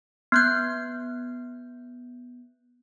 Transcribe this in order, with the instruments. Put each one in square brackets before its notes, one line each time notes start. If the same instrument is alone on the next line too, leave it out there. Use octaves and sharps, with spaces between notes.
[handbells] B3 F#6 G6